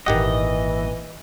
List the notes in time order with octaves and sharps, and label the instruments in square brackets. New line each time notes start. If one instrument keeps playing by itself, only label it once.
[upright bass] G#1 A#2 [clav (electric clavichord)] D#3 G4 F#5 [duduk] E3 [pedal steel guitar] D#5